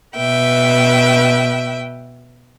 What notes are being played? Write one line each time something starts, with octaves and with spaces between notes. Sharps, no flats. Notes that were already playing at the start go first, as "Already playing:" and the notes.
B2 B4 E5 G5